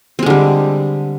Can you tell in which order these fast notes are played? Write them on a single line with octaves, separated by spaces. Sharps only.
C4 G#3 D3 G3